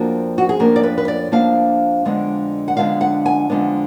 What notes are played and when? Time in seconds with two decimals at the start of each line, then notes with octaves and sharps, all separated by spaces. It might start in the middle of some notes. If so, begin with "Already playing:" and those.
Already playing: F2 F3 A#3 D4 F#4
0.38 F#4
0.49 G#4
0.59 F2 F3 A#3 D4 A#4
0.76 D5
0.83 B4
0.98 B4
1.08 D5
1.32 F2 F3 A#3 D4 F5
2.05 F2 D3 G#3 B3 D4
2.68 F#5
2.77 F2 D3 G#3 B3 D4 F5
3.01 F#5
3.26 G#5
3.50 F2 D3 G#3 B3 D4